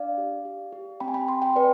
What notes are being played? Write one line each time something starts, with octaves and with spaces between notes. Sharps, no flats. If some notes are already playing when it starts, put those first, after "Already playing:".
Already playing: D4 D5 F5
G4
G4
G4
C4 G5 B5
G#5
G5 B5
G4 G#5 C6
G5 B5
C4 B4 D5